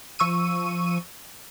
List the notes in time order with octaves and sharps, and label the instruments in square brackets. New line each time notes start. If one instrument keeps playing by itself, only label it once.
[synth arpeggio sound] F3 C#6 E6 D#7